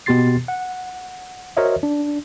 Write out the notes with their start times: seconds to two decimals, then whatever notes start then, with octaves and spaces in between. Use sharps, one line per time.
0.06 B2 B3 G4 C6 A6 C7
0.48 F#5
1.57 F#4 A#4 C5 C#5 D#5 E5
1.83 D4